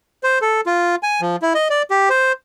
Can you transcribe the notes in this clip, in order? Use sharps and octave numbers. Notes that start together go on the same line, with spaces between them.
C5
A4
F4
G#5
F3
E4
D#5
D5
G4
C5